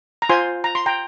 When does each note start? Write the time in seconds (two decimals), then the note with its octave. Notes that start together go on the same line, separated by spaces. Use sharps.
0.22 A#5
0.29 F4 C5 G#5 C6
0.64 A#5
0.75 C6
0.86 G5 A#5